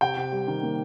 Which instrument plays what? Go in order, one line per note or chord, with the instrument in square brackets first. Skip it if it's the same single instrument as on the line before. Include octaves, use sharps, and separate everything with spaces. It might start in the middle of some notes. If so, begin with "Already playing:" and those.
[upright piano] C3 G5
C3
G3
D#3
A#3